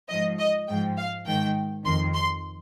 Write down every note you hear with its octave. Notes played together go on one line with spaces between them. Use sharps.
G#2 F3 D#5
D#5
G#2 F3 G5
F5
G#2 D#3 G5
F2 D#3 C6
C6